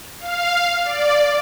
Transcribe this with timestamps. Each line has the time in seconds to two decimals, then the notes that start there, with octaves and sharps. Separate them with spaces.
0.20 F5
0.84 D5